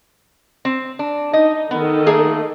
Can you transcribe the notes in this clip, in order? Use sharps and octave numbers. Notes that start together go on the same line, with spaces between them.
C4
D4
D#4 D#5
D#3 B3 A4 D#5
A3 A#3 G#4